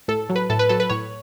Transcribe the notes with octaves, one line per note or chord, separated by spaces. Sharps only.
A2 A4
F#3
B4
A2 A4
B4
F#3 A4
B4
A2 C#5